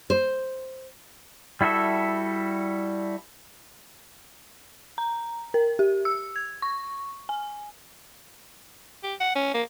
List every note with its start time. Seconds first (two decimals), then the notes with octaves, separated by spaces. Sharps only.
0.10 C5
1.61 G3 E4 F#4 A4 E5
4.98 A#5
5.54 A#4
5.79 G4
6.05 E6
6.36 G#6
6.62 C#6
7.29 G#5
9.03 G4
9.20 F#5
9.35 C#4
9.54 A#3